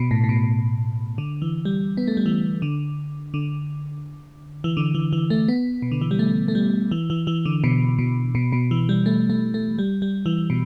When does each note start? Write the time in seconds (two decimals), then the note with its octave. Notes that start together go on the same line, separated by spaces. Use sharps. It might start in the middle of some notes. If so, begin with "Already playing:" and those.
Already playing: B2
0.11 A2
0.24 A2
0.29 B2
1.18 D3
1.42 E3
1.65 G3
1.97 B3
2.08 A3
2.17 G3
2.26 E3
2.62 D3
3.34 D3
4.64 E3
4.77 D3
4.95 E3
5.13 E3
5.30 A3
5.48 B3
5.82 B2
5.92 D3
6.01 E3
6.11 G3
6.19 A3
6.48 A3
6.55 G3
6.91 E3
7.10 E3
7.27 E3
7.46 D3
7.64 B2
7.99 B2
8.35 B2
8.52 B2
8.71 E3
8.89 G3
9.06 A3
9.30 A3
9.54 A3
9.79 G3
10.02 G3
10.26 E3
10.50 B2